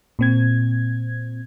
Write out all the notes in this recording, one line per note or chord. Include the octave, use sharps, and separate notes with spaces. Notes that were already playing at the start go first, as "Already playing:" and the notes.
A#2 C4 G#6